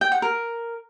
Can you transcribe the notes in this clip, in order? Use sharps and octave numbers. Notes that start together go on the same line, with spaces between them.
G5
F#5
A#4